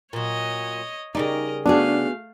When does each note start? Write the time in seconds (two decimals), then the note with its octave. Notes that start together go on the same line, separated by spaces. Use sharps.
0.13 A#2 F#3 C#5 D#5
1.15 C#3 G3 D#4 A#4 D5 D#5
1.66 A3 B3 D4 F#4 G#4 F5